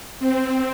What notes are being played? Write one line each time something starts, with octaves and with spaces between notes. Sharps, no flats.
C4